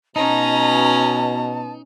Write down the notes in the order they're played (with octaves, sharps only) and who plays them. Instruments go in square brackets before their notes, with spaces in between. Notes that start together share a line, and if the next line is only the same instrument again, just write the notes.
[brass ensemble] B2 [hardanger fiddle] C#4 A#5 [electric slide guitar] D#4 [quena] A5